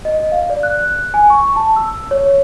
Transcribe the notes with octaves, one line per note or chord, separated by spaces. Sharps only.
D#5
F5
D5
F#6
G#5
C#6
A5
E6
C#5